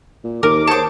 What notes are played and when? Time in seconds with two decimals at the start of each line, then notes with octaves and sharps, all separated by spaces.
0.24 A#2
0.43 D#2 A#4 D6
0.67 G#4 C5 C#5 A5 D6